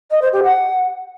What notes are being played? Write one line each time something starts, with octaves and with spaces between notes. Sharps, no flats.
D#5
C5
G4
F#5